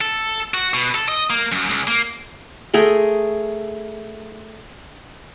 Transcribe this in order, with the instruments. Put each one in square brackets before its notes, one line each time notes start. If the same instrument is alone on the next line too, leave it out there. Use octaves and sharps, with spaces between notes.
[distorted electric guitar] A4
F#4
B2
A4
D#5
A#3
F#2
C#2
A#3
[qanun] A3 G#4 A#4 C6